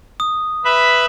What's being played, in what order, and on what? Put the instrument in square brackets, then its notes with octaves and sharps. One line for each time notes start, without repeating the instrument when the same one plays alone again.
[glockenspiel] D#6
[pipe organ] B4 E5 B5